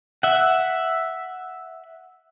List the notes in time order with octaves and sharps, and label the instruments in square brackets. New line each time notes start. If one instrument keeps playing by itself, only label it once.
[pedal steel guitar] E5 F#5